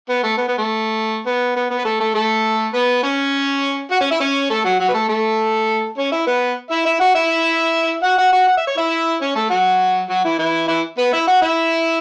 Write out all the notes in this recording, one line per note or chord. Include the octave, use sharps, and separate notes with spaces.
B3
A3
B3
B3
A3
B3
B3
B3
B4
A3 A4
A3 A4
A3 A4
B3 B4
C#4 C#5
F#4 F#5
C#4 C#5
E4 E5
C#4 C#5
A3 A4
F#3 F#4
F#3 F#4
B4
A3 A4
A3 A4
C#4 C#5
E4 E5
B3 B4
E4 E5
E4 E5
F#4 F#5
E4 E5
F#4 F#5
F#4 F#5
F#4 F#5
F#5
E5
C#5
E4 E5
C#4 C#5
A3 A4
F#3 F#4
F#3 F#4
E3 E4
E3 E4
E3 E4
B3 B4
E4 E5
F#4 F#5
E4 E5